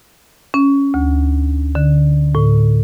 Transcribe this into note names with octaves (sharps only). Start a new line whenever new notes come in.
C#4
D2
D3
A2